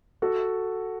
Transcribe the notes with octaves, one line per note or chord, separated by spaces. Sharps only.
F#4 A4